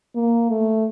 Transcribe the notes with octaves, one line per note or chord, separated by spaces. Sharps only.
A#3
A3